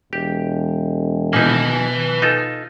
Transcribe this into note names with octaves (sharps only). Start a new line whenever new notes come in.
E1 G4
B2 A#3 D#4 B4 G#5
D#4 F4 A4